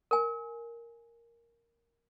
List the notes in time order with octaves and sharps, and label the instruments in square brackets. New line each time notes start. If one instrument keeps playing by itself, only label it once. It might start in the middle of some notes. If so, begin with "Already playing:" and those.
[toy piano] A#4 G#5